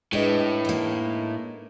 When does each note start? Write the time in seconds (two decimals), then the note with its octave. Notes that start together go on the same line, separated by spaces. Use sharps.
0.13 A2 G#3 D4 G4 B4 D#5
0.65 A#3 D#4